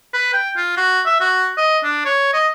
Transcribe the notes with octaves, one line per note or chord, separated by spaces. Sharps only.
B4
G5
F4
F#4
E5
F#4
D#5
D4
C#5
D#5